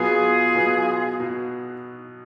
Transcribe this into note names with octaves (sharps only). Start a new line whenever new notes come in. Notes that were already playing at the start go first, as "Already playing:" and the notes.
Already playing: B2 F#3 B3 F4 G#4
B2 F#3 B3
B2